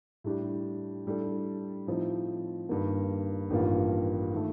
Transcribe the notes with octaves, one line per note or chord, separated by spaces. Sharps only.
A2 G3 D4 G4
A2 G3 D4 A4
A2 F3 C4 D#4
G2 D#3 A#3
A1 G2 D#3 A#3 F4
D#3 A3